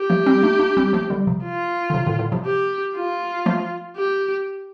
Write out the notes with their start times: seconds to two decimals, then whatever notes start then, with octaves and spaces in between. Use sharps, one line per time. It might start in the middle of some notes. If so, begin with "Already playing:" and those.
Already playing: G4
0.10 F3 A3
0.26 G3 C4
0.43 A3 D4
0.59 A3 D4
0.77 G3 C4
0.93 F3 A3
1.10 D3 G3
1.27 C3 F3
1.45 F4
1.90 D3
1.94 C3 F3
2.07 A2 D3
2.19 A2 D3
2.32 C3 F3
2.46 G4
2.96 F4
3.46 F3 A3
3.96 G4